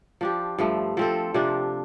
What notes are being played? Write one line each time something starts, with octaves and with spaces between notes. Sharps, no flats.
F3 D4 G4
G2 F3 A3
F3 C4 A4
C3 F3 D4